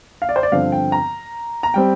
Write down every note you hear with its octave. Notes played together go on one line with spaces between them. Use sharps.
F5
D5
C5
D5
G2 D3 F3 C4 F5
G5
A#5
A#5
G3 C4 G5